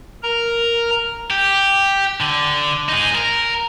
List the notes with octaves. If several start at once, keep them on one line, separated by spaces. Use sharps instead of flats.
A#4 A#5
G4
D3
D#4 G#4
A#4